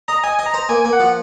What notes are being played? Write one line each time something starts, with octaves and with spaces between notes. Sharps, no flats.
D#5 A#5
D#5 G#5
D#5
A#5
C5
A#3 G#5
A#3
F#5
F3